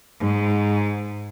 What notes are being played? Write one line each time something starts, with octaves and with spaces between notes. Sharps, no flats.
G#2